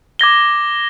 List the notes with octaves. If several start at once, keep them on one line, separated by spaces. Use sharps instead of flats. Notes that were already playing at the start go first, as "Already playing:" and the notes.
D6 G#6 A#6 G7